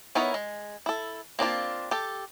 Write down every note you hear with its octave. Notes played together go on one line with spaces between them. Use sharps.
B3 D#4 E4 A#4 C#5
G#3
E4 A4
A#3 C4 D4 F4
G4 A4